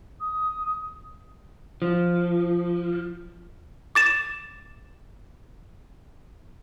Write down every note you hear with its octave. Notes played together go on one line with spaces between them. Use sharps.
D#6
F3
D6 A6 E7